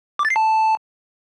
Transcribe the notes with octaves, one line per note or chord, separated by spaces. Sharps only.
D6
A6
C7
A5